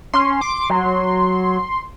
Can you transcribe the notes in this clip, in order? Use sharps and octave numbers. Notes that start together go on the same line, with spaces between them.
C#4 C6
D6
F#3